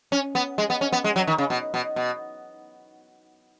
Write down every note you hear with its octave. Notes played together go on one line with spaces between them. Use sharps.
C#4
B3
G#3
B3
C#4
B3
G#3
F#3
D#3
C#3
B2
B2
B2